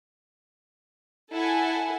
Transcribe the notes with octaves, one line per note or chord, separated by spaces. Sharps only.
E4 A4 F#5 G#5